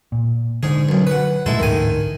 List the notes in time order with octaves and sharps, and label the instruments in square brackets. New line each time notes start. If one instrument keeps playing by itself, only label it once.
[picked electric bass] A#2
[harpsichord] G#2 G#4 [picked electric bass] D3
[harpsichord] B1 F#2
B4 F#5
[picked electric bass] F#2 A#2 A3 [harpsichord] G#3 E4 A4
[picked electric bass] A1 D2 G#2 [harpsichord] D#3 G#5